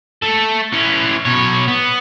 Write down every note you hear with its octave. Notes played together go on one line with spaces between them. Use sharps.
A3 A4
E3 C#4
B2 C#5
B3